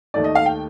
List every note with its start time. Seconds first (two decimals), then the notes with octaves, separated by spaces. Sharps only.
0.14 D#2 D#3 A3 D#4 D5
0.24 D#5
0.35 F5
0.46 G5